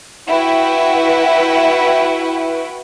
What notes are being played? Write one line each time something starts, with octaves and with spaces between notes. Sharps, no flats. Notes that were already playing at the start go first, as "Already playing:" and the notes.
E4 F#4 B4 F#5 G5